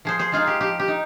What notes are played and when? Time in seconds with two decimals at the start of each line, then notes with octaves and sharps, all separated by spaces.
0.05 F3 G#4 C5
0.19 G#4 C5
0.32 G#3 D#4 F4 G#4
0.47 G4
0.61 F3 G4
0.80 G4
0.88 D#4